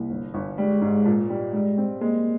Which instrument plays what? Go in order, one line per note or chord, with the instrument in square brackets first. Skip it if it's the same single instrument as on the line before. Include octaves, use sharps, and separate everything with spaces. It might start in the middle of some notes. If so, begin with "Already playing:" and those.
Already playing: [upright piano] C2 [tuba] A#3
[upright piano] G1
G1
[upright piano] G3 [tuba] G#3
[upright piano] G#2
A#2
G3
[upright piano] G3 [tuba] G#3
[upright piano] C4
[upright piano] G#3 [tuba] A#3